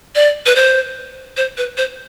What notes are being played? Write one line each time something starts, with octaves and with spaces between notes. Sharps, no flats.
D5
B4
C5
C5
B4
C5